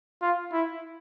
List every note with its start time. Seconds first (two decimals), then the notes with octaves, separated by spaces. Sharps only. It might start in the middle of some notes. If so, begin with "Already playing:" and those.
0.22 F4
0.52 E4